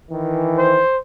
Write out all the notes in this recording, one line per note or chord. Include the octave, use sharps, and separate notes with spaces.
D#3 E3
C5